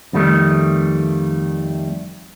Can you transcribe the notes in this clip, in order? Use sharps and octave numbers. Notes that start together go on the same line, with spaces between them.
F2 D#3 G3 A3